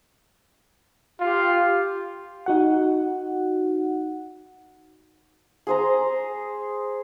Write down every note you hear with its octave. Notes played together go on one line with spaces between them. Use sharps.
F4 G4
D#4 F#4 F#5
G#4 C5 A#5